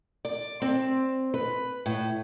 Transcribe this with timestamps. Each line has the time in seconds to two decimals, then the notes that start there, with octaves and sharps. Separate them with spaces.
0.25 D5
0.62 C4
1.34 B4
1.86 A2